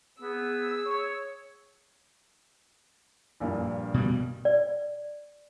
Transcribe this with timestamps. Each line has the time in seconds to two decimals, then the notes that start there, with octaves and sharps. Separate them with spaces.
0.22 B3 G#4 E6
0.85 C#5
3.40 A#1 G2 A#2
3.94 B2 G3
4.45 D5